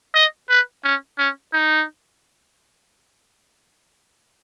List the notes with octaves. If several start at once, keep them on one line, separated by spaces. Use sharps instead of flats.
D#5
B4
C#4
C#4
D#4